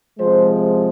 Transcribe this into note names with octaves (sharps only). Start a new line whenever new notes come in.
C3 F3 G#3 C5